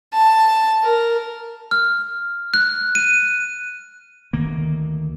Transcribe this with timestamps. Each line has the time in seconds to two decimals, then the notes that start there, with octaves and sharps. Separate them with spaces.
0.13 A5
0.83 A#4
1.71 F6
2.54 F#6
2.95 D#7
4.33 D2 D#3 A#3